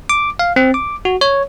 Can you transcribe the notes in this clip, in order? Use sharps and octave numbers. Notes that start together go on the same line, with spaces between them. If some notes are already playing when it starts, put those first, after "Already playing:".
D6
F5
C4
D6
F#4
C#5